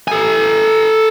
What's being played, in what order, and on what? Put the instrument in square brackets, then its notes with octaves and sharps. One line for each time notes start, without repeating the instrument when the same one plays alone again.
[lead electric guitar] A4 G#5